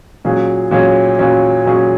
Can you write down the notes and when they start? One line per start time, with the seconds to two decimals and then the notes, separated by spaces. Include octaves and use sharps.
0.24 A#2 F#3 C#4 G#4
0.71 A#2 F#3 C#4 G#4
1.18 A#2 F#3 C#4 G#4
1.65 A#2 F#3 C#4 G#4